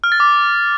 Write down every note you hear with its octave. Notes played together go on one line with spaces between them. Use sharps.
F6
A6
D6